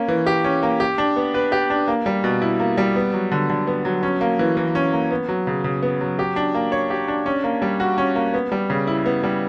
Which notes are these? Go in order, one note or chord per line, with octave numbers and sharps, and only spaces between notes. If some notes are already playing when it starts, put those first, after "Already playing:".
Already playing: A#3 C#4
E3
G4
C#4
A#3
G4
D4
B3
B4
G4
D4
A#3
G3
B2
E4
A#3
G3
B3
F#3
D3
D3
B3
F#3
C#4
A#3
E3
E3
C#4
A#3
B3
F#3
C#3
C#3
B3
F#3
G4
D4
A#3
C#5
G4
D4
C#4
A#3
G3
F#4
C#4
A#3
B3
G3
C#3
E4
B3
G3